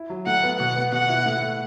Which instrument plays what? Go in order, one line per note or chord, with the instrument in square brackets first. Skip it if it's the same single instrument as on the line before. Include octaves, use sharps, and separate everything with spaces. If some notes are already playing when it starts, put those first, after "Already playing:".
Already playing: [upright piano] E4
F#3
[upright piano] A2 [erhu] F#5
[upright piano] B3
[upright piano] B2 [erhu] F#5
[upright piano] B3
[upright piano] B2 [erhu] F#5
[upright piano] E4
A2
A3